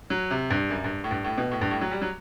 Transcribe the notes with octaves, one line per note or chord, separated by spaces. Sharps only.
F#3
C3
G2
F#2
G2
A2
G2
A2
B2
A2
G2
A2
F#3
G3
F#3